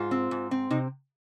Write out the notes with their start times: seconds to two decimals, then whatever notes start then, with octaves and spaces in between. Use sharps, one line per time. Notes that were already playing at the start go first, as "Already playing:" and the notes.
Already playing: G#2 F4
0.11 C4
0.31 G#2
0.51 C4
0.71 C3 D#4